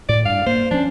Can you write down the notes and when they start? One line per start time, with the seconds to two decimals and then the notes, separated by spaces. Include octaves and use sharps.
0.09 A2 D5
0.26 G2 F5
0.46 A#3 C5
0.71 F3 C#4 D4